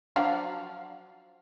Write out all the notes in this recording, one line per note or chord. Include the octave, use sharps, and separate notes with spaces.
F3 F#3 D4 F5